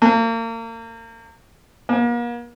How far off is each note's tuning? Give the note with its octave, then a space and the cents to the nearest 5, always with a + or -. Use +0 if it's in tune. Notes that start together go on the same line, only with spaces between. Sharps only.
A#3 -35
A#3 +40